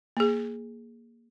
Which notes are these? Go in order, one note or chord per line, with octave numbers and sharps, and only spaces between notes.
A#3 G#4